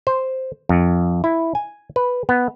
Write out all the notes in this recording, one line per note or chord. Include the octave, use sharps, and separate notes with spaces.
C5
F2
E4
G#5
B4
B3